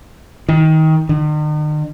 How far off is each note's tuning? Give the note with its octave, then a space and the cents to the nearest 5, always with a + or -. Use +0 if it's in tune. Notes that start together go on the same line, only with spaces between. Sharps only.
D#3 +20
D#3 -45